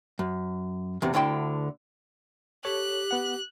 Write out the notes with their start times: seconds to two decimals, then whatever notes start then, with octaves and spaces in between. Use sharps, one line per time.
0.19 F#2
1.02 E2 C3
1.14 D2 D3 E4 G5 C6
2.65 G4 A4 C#5 F#6
3.11 B3 F#5